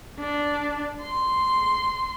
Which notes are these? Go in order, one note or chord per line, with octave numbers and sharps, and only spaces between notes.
D4
C6